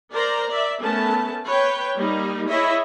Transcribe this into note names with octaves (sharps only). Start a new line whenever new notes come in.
A#4 C5 D5 A#5
D5 E5
A3 B3 C#4 A#4 A5
B4 C#5 G5
G3 A#3 D#4
E4 G#4 C#5 D#5 E5